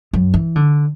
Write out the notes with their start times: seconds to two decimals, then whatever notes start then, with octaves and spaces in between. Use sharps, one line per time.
0.13 F#2
0.34 E3
0.56 D3